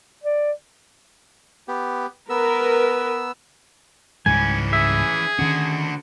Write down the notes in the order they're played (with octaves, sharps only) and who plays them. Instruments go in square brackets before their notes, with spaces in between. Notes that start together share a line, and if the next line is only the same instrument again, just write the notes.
[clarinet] D5
[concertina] B3 G4
[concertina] B3 E6 [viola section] A#4 B4
[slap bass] C#2 G#2 G3 [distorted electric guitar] E3 C#4 [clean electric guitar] G#5
[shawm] G#4 [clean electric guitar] E5
[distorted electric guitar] D3 F#4 [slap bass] D#3 C#4